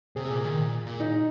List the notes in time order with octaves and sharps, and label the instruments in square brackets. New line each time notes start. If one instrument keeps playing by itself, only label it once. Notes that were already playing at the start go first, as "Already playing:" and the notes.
[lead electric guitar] C3 [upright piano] G#4
[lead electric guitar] A#2
D#3
A#2
A#2
[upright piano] D#4